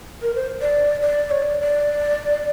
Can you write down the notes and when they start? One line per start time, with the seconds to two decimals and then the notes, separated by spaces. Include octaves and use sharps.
0.22 A#4
0.35 C5
0.61 D5
1.02 D5
1.31 C#5
1.42 D5
1.61 D5